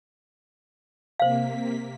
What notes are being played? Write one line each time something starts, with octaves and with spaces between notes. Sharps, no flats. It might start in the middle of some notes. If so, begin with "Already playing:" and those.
C3 A#3 C5 F5 B6